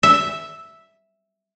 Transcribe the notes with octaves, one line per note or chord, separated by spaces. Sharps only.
E5